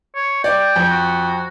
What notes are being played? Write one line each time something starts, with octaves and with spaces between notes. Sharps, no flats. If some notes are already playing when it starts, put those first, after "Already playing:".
C#5
D5 G5
F2
F#4